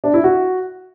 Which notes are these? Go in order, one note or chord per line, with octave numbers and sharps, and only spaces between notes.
D4
E4
F#4